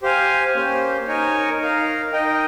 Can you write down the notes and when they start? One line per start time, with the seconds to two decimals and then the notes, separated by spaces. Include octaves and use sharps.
0.03 G4 C5 F5 G#5
0.55 A#3 C#4 G4 C5
1.07 D#4 A#4 C#5 G#5
1.60 D#4 A#4 F5
2.12 D#4 A#4 D#5 G5